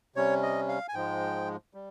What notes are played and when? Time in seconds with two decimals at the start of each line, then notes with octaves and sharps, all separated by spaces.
0.16 C3 G3 C#4 C#5
0.43 D#5
0.68 F5
0.88 G#5
0.94 G#2 F3 G#3 G5
1.74 G3